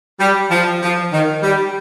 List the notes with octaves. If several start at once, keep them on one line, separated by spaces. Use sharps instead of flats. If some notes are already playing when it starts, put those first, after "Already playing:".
G3
F3
F3
D#3
G3